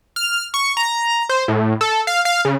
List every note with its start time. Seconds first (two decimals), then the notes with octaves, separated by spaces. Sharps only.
0.16 F6
0.54 C#6
0.77 A#5
1.29 C5
1.48 A2
1.81 A4
2.07 F5
2.25 F5
2.45 C#3